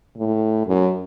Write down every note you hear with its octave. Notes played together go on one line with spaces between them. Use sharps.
A2
F#2